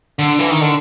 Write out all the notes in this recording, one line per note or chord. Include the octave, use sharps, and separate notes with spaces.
D3
E3
D#3
D3